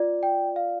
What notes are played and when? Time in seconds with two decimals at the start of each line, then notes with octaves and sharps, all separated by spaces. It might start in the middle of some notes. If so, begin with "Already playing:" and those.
Already playing: F4 D5
0.23 G5
0.56 F5